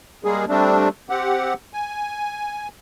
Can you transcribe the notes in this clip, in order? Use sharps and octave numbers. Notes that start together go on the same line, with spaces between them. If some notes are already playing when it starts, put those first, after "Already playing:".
G3 G#3 A#3 G#4
G3 A3 C4 D4
C4 G4 F#5
G#5